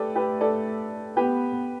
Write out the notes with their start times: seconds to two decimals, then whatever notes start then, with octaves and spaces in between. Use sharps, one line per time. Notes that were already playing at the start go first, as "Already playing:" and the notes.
Already playing: A3 G4 A4 B4 D5
0.15 G4 B4
0.41 A4 D5
1.16 B3 G4 B4